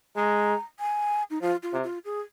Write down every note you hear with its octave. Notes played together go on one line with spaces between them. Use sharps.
G#3 A#5
G#5
D#4
F3 F4
F4
C3
F4
G#4